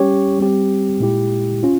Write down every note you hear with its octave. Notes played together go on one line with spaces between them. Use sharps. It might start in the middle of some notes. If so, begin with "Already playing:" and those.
Already playing: G3 C#4 G4 C#5
G3 C4 G4
A#2 G#3 E4 G4
C#4 F4